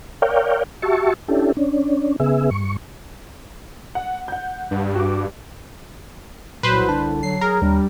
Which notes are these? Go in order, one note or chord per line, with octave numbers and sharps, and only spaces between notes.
A#4 C#5 D5 F5 G5
F#4 G4 E5 A5 C#6
C#4 D4 E4 G4 A4
C#4 D4
C#3 B3 G#4 E5
G2 C#6
F#5
F#5 G6
G2
F#4 D6
C2 A#2 F#3 B4 C5
D3 A5
F#3 C7
G#4 A#4
D#2 G3 D4